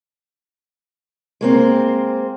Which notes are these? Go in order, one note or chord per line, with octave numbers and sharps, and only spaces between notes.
G#3 A#3 C4